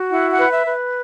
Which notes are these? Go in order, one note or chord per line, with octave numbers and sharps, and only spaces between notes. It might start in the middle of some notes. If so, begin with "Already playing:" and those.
Already playing: F#4
E4 F#5
F#5
B4
E5
B4